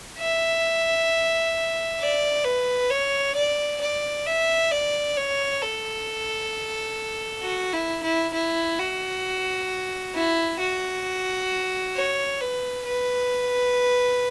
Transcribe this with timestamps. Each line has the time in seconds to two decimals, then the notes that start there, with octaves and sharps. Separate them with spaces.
0.19 E5
2.00 D5
2.44 B4
2.90 C#5
3.35 D5
3.81 D5
4.26 E5
4.71 D5
5.16 C#5
5.62 A4
7.43 F#4
7.73 E4
8.03 E4
8.33 E4
8.79 F#4
10.15 E4
10.60 F#4
11.96 C#5
12.41 B4
12.86 B4